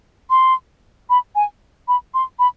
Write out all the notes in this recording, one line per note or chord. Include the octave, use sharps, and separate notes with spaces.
C6
B5
G#5
B5
C6
B5